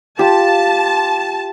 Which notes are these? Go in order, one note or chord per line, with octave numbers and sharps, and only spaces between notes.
F4 G4 A5